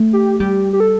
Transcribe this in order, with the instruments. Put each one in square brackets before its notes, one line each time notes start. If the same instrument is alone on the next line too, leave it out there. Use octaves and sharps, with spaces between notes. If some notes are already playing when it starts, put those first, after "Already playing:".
Already playing: [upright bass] A3
[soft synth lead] G4
[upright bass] G3 [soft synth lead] G4
[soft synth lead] G4
A4